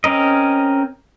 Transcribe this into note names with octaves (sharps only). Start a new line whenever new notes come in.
C4 C#4 A#4 D#5